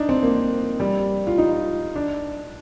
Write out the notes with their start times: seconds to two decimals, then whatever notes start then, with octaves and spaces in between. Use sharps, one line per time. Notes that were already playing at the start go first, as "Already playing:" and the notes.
Already playing: D4 D#4
0.09 C4
0.23 A#3
0.80 G3
1.27 F4
1.38 D#4
1.96 D4